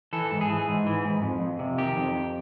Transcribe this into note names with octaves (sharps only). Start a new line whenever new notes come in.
E3 A4
G#2
G#4
E3
G#2
E3
G#2
F2
F2
C3
D#3 G4
F2
F2